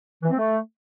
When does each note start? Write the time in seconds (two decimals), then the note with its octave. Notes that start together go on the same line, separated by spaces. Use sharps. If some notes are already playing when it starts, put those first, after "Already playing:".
0.23 E3
0.30 C4
0.37 A3